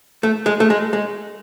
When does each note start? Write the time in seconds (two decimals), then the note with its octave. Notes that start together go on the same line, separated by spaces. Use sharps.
0.23 A3
0.46 G#3
0.60 A3
0.70 G#3
0.93 G#3